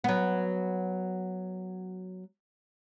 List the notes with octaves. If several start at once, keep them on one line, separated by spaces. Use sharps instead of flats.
F#3 B3